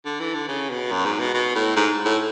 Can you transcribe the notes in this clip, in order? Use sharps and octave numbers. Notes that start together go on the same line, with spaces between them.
D3
E3
D3
C#3
B2
F#2
G#2
B2
B2
A2
G#2
A2